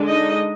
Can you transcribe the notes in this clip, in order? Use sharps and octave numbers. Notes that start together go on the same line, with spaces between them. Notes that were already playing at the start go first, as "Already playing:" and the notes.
Already playing: D3 G#3 D4
D#4 D#5